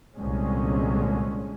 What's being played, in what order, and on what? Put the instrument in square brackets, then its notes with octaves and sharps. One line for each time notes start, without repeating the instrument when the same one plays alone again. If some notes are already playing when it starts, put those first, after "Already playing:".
[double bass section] C2 A#2 D3 G#3 C#4